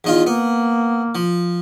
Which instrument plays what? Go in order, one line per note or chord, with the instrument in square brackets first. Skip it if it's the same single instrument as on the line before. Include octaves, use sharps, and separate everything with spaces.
[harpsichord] E2 D#4 F4
[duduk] A#3 [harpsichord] B3
[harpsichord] F3